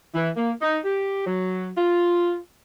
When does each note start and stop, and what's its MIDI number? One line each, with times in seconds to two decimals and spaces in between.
0.15 0.30 52
0.37 0.52 58
0.62 0.80 63
0.85 1.23 67
1.27 1.69 54
1.78 2.38 65